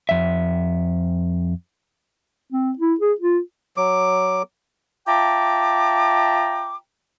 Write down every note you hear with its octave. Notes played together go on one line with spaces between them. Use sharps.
F2 E5
C4
E4
G#4
F4
F#3 D6
F4 E5 G5 A5 A#5 D6